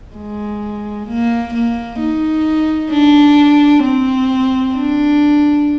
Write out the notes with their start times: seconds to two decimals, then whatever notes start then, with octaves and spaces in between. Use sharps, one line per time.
0.16 G#3
1.08 A#3
1.54 A#3
2.00 D#4
2.91 D4
3.83 C4
4.74 D4